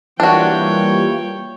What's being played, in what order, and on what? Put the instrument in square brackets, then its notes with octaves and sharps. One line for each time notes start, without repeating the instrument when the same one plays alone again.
[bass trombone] E3 [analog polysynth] G3 A#3 F4 [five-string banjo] D4 F#4 [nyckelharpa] C#5 G5